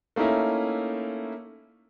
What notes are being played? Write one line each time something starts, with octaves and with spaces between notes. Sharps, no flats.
A3 A#3 C#4 D#4 E4